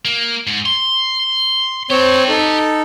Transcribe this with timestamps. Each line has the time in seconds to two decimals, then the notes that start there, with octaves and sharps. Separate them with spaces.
0.05 A#3
0.47 G#2
0.66 C6
1.90 C4 G4 C#5 A5
2.29 D#4 A4